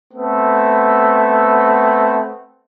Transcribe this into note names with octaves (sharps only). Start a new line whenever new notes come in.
A3 B3 C4